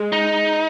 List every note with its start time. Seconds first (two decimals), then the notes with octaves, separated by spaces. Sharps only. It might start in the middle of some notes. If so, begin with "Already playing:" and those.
Already playing: G#3
0.13 D#4